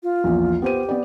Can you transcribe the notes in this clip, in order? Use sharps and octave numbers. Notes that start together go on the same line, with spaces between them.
F4
A#1 E2
B3 G4 C5 D#7
B3 B4 D5